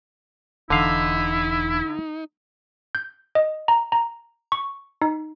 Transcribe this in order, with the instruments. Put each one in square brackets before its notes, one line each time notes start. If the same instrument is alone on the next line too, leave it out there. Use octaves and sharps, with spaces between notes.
[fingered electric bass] E1 E3 [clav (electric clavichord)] D3 F5 [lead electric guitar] D#4 [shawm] E4
[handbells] G6
D#5
A#5
A#5
C#6
D#4